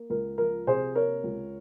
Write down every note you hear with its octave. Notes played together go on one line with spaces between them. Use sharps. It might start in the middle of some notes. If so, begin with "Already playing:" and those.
Already playing: A#3
C#2 A#4
F3 A#4
C3 G#4 C5
A#3 A#4 C#5
C#2